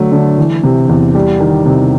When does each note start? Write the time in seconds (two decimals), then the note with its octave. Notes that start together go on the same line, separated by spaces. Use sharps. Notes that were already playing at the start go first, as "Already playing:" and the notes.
Already playing: D3 F#3 A3
0.12 D3
0.38 E3
0.64 C3
0.89 E2
1.15 G3
1.40 D#3
1.66 C3